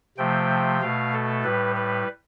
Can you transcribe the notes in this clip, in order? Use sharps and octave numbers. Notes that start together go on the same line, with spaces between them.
C3 F3 A3 G5
B2 A3 F5
A4
A2 G3 B4
B4